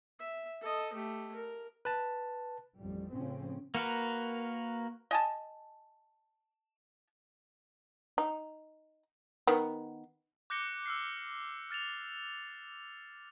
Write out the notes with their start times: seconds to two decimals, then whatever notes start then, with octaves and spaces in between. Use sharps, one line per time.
0.19 E5
0.61 A4 D#5
0.93 A3 G4
1.35 A#4
1.85 B4 A5
2.78 A1 F2 G3
3.13 A2 C#3 F3 C4 C#4
3.75 A#3 F#4 A#4 B4
5.11 D#5 G#5 A5
8.18 D#4
9.47 D#3 B3
10.50 D6 F#6 G6 A#6 C#7 G7
10.86 E6 F6 C7
11.71 F6 A6 E7 F7